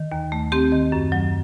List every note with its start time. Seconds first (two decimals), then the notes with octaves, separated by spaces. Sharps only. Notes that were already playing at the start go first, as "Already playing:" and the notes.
Already playing: D#3
0.12 D#2
0.32 A3
0.52 C4 G4
0.72 D#3
0.92 F#2
1.12 F#3